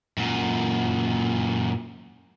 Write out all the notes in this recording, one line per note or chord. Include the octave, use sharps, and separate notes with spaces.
F#2 A#2